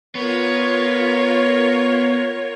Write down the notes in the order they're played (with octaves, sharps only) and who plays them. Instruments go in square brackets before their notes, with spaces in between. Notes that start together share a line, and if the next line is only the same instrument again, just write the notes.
[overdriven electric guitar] B3 [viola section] F4 A#4 C#5